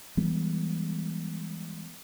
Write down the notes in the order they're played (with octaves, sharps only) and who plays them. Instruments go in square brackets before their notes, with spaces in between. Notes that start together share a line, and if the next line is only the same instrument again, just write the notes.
[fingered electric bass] E3 G3 G#3 B3